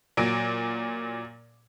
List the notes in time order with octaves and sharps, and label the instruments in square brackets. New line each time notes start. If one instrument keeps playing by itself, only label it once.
[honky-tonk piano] A#2 F#3 D7